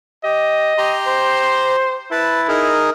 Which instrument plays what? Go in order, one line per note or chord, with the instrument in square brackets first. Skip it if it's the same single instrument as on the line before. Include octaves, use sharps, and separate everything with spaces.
[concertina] G4 [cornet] D#5
[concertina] G4 A#5 C6
[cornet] C5
[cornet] E4 [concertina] B4 A5
[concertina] D#4 G#4 A#4